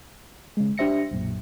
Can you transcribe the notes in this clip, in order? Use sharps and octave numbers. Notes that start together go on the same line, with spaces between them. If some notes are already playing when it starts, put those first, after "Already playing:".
C#3 G#3
D4 G4 C5 E5 A#6 C#7
B1 F#2 A#2